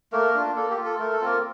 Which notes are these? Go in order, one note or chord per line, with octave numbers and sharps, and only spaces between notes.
A3 A#3 A#4
D4 F4
A#3 A4
G4
F4
A4
A3 A#4
A4
A#3 C4 F4 A#4